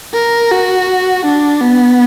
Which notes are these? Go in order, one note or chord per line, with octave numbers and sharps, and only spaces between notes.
A#4
F#4
D4
B3